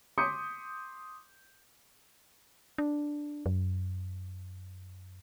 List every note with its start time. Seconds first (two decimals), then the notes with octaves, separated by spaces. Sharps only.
0.18 C6 D6 D#6 G6 B6 C#7
2.78 D4
3.46 F#2